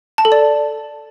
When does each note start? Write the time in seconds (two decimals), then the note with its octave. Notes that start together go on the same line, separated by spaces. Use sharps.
0.18 A5
0.25 A4
0.32 D5